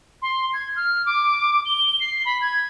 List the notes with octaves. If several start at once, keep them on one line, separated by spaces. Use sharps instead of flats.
C6
G#6
F6
D6
G7
C7
B5
G#6